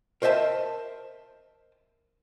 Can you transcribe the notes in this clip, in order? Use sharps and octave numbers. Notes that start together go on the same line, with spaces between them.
A#4 C5 D#5 E5 A5